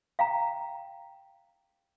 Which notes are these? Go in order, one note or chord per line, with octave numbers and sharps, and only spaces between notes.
F5 G5 A#5